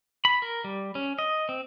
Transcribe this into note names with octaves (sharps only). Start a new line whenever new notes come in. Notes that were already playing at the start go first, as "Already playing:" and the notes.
B5
A#4
G3
C#4
D#5
C4